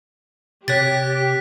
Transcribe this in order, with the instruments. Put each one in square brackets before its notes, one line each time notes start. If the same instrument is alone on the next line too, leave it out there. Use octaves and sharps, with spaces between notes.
[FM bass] C3 [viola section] G4 [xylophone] C#5 A6 [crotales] F#6 B6 D7